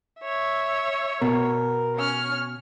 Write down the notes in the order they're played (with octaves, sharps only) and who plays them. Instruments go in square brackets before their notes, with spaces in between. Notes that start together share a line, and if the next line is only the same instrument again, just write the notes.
[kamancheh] C#5 E5
[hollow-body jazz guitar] B2 [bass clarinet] A#4
[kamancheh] C#4 F6